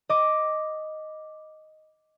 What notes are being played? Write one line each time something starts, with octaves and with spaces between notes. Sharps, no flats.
D#5 D6